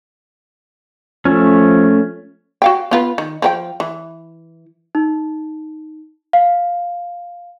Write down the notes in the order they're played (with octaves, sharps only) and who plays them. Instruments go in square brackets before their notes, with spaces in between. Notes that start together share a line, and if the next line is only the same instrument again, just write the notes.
[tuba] F3 [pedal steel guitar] A3 C#4
[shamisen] F#4 F5 G5
B3 F4 B4
D#3
F3 A#4 G5
E3
[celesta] D#4
F5